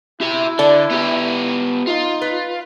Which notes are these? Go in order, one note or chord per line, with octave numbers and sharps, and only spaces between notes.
E4 G4 E5
D3 A4 D5
B3 G4
D#4 F4
B4